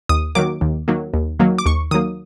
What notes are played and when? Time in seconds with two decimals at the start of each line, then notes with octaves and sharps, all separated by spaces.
0.09 D#2 D#6
0.35 D#3 F#3 A#3 D6
0.61 D#2
0.88 D#3 F#3 A#3
1.14 D#2
1.40 D#3 F#3 A#3
1.59 D6
1.66 D#2 C#6
1.91 D#3 F#3 A#3 D#6